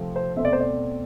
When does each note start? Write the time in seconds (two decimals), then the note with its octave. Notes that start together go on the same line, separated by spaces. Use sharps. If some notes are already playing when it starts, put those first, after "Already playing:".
Already playing: C3 F3 A3 C4
0.16 C5
0.36 B2 A3 C4 E5
0.45 D5
0.53 C5
0.60 D5